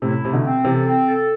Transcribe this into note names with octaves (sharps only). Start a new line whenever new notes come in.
A2 C3 E4
C3 A3
B2 D3
C4
C3 E3 A4
C4
A4